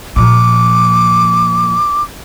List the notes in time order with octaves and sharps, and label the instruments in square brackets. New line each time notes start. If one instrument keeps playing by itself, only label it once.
[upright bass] A#2 F3 [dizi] D6